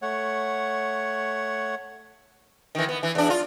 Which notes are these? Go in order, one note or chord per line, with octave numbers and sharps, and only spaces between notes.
A3 C#5 F#5
D#3 E3
B3
E3
E2 D4
F4